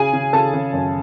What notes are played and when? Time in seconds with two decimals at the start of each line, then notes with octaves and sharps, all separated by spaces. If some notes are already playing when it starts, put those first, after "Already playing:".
Already playing: C#3 G#4 G#5
0.13 C#3
0.33 C#3 A4 A5
0.53 C#3
0.73 F#2